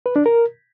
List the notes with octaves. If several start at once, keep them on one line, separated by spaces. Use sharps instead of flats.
B4
D4
A#4